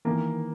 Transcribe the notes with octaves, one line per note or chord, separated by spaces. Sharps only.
D#3 E3 A#3